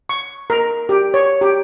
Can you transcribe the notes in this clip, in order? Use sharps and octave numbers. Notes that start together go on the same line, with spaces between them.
C#6
A#4
G4
C#5
G4